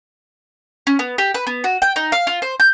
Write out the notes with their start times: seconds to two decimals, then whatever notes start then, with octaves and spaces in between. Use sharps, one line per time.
0.87 C#4
0.99 B3
1.18 G4
1.34 B4
1.47 B3
1.64 F#4
1.82 G5
1.96 D#4
2.12 F5
2.27 F4
2.42 C5
2.60 G6